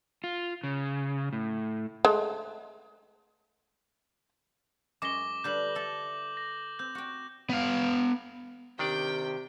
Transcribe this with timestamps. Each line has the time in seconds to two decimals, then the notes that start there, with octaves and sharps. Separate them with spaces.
0.24 F4
0.64 C#3
1.33 A2
2.05 G#3 A3
5.02 F#2 G#3 C#5 D6 A#6 G7
5.44 D3 G3 B4 G6 F#7
5.75 A4 E5
6.37 A#6
6.79 C4 G6
6.95 F#4 G5
7.50 B3 F5
8.79 C3 D#3 D4 G4 D5 G5